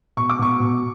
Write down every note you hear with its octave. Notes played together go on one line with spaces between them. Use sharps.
B2 C#6
D6
B2 C#6
B2